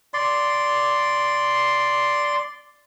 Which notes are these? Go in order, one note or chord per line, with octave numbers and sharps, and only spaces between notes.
D5 C6